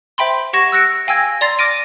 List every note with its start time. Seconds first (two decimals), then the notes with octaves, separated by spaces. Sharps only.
0.18 C5 E5 G5 B5 C6
0.53 G4 F#5 C#6 G#6 A#6 E7
0.72 E6 F#6 A#6 C#7 D7
1.07 F5 G5 G#5 E6 G#6 A#6
1.41 D5 A#5 C6 A6 C7
1.59 D6 F6 A6 A#6 D7 D#7